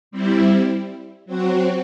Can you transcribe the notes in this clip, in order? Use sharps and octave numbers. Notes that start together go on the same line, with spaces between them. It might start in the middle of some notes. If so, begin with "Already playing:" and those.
G3 C4 E4
F#3 C4 F#4